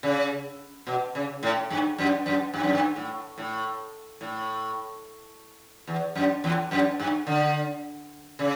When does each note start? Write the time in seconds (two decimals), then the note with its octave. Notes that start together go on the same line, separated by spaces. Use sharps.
0.03 C#3
0.87 B2
1.15 C#3
1.43 A2
1.70 G2
1.98 F#2
2.26 F#2
2.54 G2
2.63 F#2
2.73 G2
2.96 A2
3.38 A2
4.21 A2
5.87 E2
6.15 F#2
6.44 E2
6.71 F#2
7.00 G2
7.27 D3
8.39 C#3